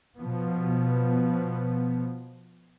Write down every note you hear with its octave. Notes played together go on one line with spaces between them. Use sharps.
B2 F3 B3